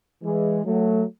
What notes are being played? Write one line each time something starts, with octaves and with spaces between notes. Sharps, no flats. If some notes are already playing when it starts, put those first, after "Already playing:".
E3 G#3
F#3 A3